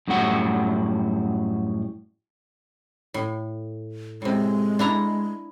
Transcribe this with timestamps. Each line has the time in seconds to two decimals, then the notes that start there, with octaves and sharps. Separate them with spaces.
0.08 F#2 A2 G3 F#4 F#5
3.14 A2
4.22 A2 C3 G#3
4.79 D4 E4 A#5